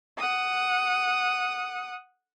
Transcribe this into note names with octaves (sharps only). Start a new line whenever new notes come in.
F#5 D#6